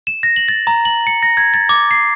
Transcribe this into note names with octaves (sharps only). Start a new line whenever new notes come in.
E7
A#6
F#7
A6
A#5
F#7
C#7
A#6
G#6
A6
D6
C7